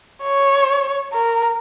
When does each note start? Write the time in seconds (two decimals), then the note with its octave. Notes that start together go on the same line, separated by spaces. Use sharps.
0.23 C#5
1.13 A#4